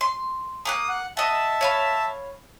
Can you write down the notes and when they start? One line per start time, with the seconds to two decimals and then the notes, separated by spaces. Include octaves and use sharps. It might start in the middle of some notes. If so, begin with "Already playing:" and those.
0.01 C6
0.65 A#3 G5 D#6 F#6
0.89 F#5
1.17 D#5 E5 F#5 A5
1.61 C#5 F5 B5